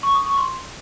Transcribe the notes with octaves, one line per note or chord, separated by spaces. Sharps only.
C#6
D#6
C#6
C6